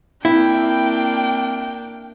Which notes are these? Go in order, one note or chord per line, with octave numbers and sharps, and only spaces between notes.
A#3 C4 D4 E4 G5